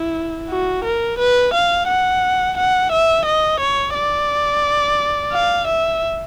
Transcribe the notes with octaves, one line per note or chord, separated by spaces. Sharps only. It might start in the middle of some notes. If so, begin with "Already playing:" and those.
Already playing: E4
F#4
A#4
B4
F5
F#5
F#5
E5
D#5
C#5
D5
F5
E5